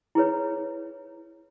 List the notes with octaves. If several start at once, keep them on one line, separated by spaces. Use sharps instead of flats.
E4 G#4 B4 C#5